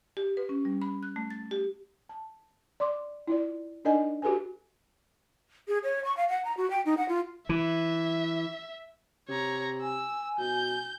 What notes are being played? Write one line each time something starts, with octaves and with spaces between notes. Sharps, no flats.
G4
B4
C#4
G3
B5
F#6
A3
A6
G4
A5
D5 C6 D6
E4 F4 D5
D4 D#4 A#4 D5 D#5 G#5
F#4 G4 A4 B4 G#5
G#4
C#5
C#6
F5
F#5
A#5
F#4
G5
D#4
F#5
F4
E3 E5
C3 C#5 A#5
G#5 E6
B2 G6